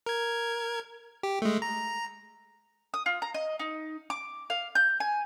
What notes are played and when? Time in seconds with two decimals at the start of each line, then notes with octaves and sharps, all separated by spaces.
0.06 A#4 G#6
1.23 G4
1.42 G#3 A3
1.62 A#5
2.94 D#6
3.06 F4
3.22 A#5
3.34 D#5
3.59 D#4
4.10 D6
4.50 F5
4.75 G6
5.00 G#5